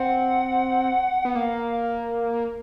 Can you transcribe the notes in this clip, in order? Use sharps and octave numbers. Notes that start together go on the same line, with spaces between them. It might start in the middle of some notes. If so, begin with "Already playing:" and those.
Already playing: C4 F#5
B3
A#3 F5